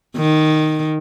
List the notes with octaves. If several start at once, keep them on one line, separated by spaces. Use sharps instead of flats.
D#3